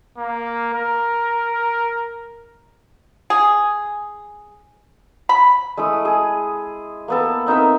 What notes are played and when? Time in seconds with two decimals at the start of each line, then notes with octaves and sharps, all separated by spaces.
0.18 A#3
0.74 A#4
3.30 G#4
5.29 B5
5.77 G#3 A3 E4 D#6
6.05 G#4
7.08 A#3 B3 A4
7.46 C4 D#4 A#4 E5